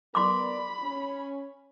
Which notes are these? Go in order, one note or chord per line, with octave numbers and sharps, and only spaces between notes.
B3 A#4 D5 B5 C6 D6
C#4